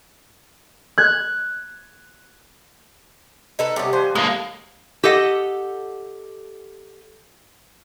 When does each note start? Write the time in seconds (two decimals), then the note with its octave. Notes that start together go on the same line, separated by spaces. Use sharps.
0.98 F#6 G#6
3.59 D#4 A4 B4
3.76 C3 G3 B3 C#4 D5
3.93 F3 B4 C5 G#5
4.15 A2 D3 G#3 A#3 F5
5.04 G4 A4 D#5 F#5